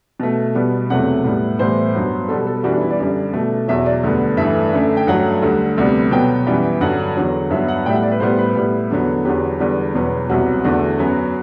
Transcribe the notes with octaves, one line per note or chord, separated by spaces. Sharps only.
B2 A3
B2 G3 B3
E2 C3 F#3 A3 F#5
A2 G3 B3
A2 E3 G3 B3 C5
G2 F#3 B3
B2 G3 B3 A4
A4
F#2 E3 G3 B3 F#4
D4
E4
D5
F#2 D3 G3
B2 A3
E2 B2 F#3 E5
D5
D2 D3 G3 B3
G2 E3 A3 E5
F#2 D3 A3
G5
G2 F#3 A3 F#5
D2 D3 G3
D2 C3 G3 B3
B2 F#3 B3 G5
F#2 E3 G3 B3
G2 D3 F#3 F#5
E2 D3 F#3
G2 F#3 B3 E5
F#5
A2 G3 B3 E5 G5
F#5
D5
B4
A2 G3 B3 C5
B4
A2 G3 B3
E2 D3 F#3 B3
E2 D3 F#3 B3 G4
E2 D3 G3 B3
E2 B2 F#3 B3
C2 C3 F#3 B3 F#4
E2 D3 A3 F#4
F#2 F#3 B3